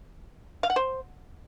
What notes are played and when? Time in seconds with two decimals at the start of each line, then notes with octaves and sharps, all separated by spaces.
0.63 F5
0.70 F#5
0.76 C5